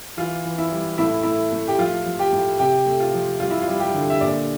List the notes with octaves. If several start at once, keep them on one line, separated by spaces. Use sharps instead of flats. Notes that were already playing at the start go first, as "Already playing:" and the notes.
E3 F4
E3
E4
G3
A2 E4
A3 E4
A3
G4
F3 F4
F3
G4
A2
C3 G4
A3
F4
F3
G3 F4
E4
F4
G3
G4
D3
E5
A#2 D5